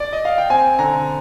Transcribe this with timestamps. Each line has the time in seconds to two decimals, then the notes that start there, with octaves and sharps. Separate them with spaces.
0.00 D5
0.13 D#5
0.25 F5
0.38 G5
0.50 C4 G#5
0.79 D3 A#5